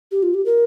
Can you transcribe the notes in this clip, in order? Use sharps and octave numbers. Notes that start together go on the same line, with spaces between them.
G4
F4
G4
A#4